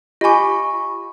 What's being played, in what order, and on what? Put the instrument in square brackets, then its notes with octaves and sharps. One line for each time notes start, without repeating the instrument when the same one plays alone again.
[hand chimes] F4 C#6 [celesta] G4 B5 D6 [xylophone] D#5 G#5